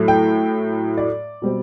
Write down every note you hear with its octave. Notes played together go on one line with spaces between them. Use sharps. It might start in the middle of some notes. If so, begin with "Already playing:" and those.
Already playing: A2 F#3 A3
G5
D5
B2 G3 C4